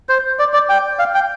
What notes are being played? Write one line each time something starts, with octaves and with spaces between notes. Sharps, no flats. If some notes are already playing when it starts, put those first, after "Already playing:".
C5
D5
D5
G5
F5
G5